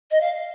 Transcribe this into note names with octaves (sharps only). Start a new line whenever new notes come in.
D#5
F5